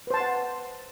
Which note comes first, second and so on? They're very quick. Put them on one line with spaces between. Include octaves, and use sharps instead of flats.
B4 C5 A5 C6 F#5